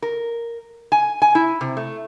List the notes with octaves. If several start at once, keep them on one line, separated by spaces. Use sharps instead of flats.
A#4
G#5
G#5
E4
C3
A3